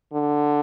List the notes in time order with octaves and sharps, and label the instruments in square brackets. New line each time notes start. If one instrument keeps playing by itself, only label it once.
[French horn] D3